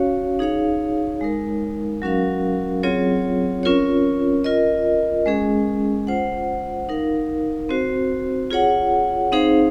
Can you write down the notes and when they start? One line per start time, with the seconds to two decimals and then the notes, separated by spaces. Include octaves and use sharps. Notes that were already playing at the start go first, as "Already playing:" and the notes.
Already playing: C#4 F#4 C#5 F5
0.39 D#4 G#4 C#5 F5
1.21 G#3 D#4 A#4
2.02 F#3 C#4 F#4 A#4 F5
2.83 F#3 C4 F4 G#4 C#5
3.63 C#4 F4 A#4 C#5
4.44 F4 A#4 D#5
5.26 G#3 C#4 G#4
6.07 F4 C5 F#5
6.89 D#4 A#4 F5
7.69 C4 F#4 C5
8.51 F4 G#4 C#5 F#5
9.32 C4 D#4 G#4 C5 F5